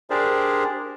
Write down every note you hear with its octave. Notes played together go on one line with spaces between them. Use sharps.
D4 G4 G#4 A#4 C5 D5